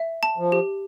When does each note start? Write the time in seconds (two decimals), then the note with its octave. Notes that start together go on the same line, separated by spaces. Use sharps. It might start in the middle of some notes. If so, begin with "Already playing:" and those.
Already playing: E5
0.23 A5
0.37 F3
0.52 G4